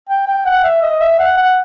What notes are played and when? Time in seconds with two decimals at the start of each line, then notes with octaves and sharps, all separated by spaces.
0.09 G5
0.27 G5
0.45 F#5
0.64 E5
0.82 D#5
1.01 E5
1.19 F#5
1.37 F#5